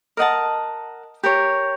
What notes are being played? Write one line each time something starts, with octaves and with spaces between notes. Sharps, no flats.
A#4 D#5 F#5 A5
G4 A#4 C#5